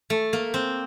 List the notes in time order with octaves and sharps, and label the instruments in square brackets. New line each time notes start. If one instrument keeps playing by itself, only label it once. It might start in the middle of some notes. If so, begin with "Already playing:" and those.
[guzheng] A3
A#3
C4